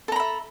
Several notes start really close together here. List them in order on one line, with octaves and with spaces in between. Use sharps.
A4 A#5 B5 E5